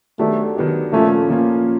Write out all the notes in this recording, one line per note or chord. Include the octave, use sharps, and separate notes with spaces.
D#3 F#3 A3 B3 D4 G4
D#3 F#3 B3 D4 G4
A#2 F3 A3 A#3 C#4 F4
A#2 F3 A#3 C#4 F4